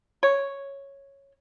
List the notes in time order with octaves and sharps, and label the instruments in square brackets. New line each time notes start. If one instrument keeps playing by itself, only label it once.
[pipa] C#5